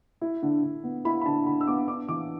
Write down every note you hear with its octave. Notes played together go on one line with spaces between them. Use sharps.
E4
D3
D3
B3
E4 B5
B5
D3 A5
D3 B5
E6
B3 D6
D4 D6
E3 D6